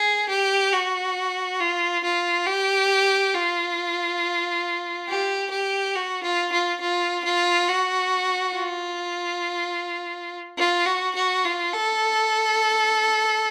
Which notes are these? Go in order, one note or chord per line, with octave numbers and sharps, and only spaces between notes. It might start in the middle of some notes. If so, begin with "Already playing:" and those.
Already playing: G#4
G4
F#4
F4
F4
G4
F4
G4
G4
F#4
F4
F4
F4
F4
F#4
F4
F4
F#4
F#4
F4
A4